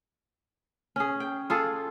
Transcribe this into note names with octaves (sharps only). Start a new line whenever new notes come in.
C#4 G#4
G5
F4 G#4 A4